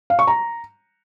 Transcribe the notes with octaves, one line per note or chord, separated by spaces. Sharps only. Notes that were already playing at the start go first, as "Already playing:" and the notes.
F5
C#6
A#5